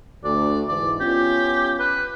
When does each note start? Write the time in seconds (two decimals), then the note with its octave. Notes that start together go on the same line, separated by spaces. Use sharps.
0.24 D2 D5
0.68 G#2 E3 D5
1.00 B3 C#4 F4 G4
1.79 B4